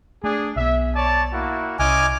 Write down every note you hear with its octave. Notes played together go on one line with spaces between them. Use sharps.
A3 D4 G#4
B1 B3 E5
C#5 D5 A5
A#3 E4 F#4
C2 C#4 E4 D#5 G#5 D6 F6